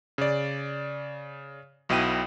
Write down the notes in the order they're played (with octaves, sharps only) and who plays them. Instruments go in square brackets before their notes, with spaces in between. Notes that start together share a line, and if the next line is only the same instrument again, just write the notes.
[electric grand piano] C#3 D5
B1 B2 E4 G5 D#7